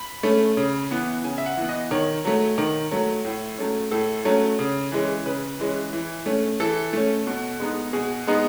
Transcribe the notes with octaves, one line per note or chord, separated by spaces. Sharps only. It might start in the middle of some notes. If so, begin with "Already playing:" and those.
Already playing: B5
A3 C#4
C#3
E3 B3
C#3 G#5
E5
F#5
E3 B3
D#5
D#3 C#5
F#3 A3
D#3
F#3 A3
A2
F#3 A3 C#4
A2 A4
F#3 A3 C#4
C#3
E3 G#3 C#4
C#3 B4
E3 G#3 C#4
E3
A3 C#4
E3 A4
A3 C#4
B2
G#3 B3 D#4
B2 G#4
G#3 B3 D#4